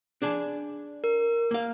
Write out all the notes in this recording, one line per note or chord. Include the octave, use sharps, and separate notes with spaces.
D4 G#4 A5
A#4
A#3 F5